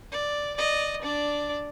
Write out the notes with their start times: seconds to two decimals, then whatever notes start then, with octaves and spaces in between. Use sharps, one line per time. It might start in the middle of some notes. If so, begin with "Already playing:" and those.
0.12 D5
0.56 D5 D#5
1.02 D4 D5